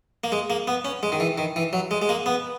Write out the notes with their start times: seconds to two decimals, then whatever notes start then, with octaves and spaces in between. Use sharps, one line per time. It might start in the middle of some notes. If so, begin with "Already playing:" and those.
0.24 A#3
0.32 G#3
0.50 A#3
0.67 B3
0.85 C#4
1.03 G#3
1.12 D#3
1.20 E3
1.38 D#3
1.56 E3
1.73 F#3
1.91 G#3
2.02 G#3
2.09 A#3
2.26 B3